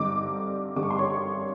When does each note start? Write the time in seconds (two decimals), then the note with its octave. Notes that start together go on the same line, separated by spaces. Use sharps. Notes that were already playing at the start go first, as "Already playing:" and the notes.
Already playing: G2 D3 G3 C4 D#4 D6
0.76 G2 D3 G3 C4 D#4 D6
0.83 C#6
0.90 C6
0.98 C#5 C#6